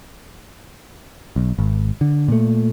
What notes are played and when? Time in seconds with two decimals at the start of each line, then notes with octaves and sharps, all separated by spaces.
1.36 B1
1.59 G#1
2.01 D3
2.28 A#2 A3